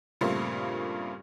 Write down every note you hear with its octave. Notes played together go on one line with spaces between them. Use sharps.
G2 A#2 C#3 A3 A#3 C4